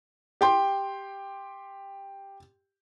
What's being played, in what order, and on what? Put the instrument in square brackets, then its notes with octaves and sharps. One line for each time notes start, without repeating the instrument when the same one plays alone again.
[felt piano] G4 G5 C6